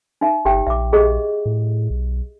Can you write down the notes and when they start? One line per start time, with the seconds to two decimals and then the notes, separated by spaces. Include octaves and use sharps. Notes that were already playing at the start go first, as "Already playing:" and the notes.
0.21 D#4 E5
0.45 G1 G4 E5 G5
0.67 A#1 E5 D6
0.93 G4 G#4 D#5
1.46 A2
1.90 B1